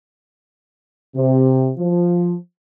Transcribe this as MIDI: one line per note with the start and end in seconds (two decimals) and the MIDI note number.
1.16 1.71 48
1.78 2.34 53